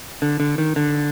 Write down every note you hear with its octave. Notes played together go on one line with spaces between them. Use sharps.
D3
D3
D#3
D3